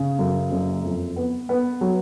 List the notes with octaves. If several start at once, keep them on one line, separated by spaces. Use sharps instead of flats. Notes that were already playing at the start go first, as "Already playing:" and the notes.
Already playing: C#3
F#2
F#1
F2
B3
B3
F#3